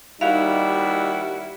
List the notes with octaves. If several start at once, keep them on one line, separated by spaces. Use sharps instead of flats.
D#2 G3 D#4 E4 F#4 E5 F5